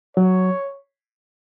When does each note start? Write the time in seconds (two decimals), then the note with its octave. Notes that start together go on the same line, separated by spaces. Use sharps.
0.17 F#3 C#5